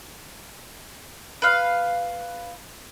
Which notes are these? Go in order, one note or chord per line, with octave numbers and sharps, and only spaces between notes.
B4 F5